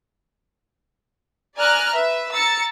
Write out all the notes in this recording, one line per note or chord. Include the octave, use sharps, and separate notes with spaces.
D5 G#5 A#5 F6 F#6
B4 E5
A#5 E6 A6 C#7